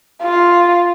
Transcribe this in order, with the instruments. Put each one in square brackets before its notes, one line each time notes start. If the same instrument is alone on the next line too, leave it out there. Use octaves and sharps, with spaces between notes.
[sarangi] F4